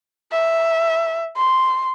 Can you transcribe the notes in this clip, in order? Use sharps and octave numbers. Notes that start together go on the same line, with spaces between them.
E5
C6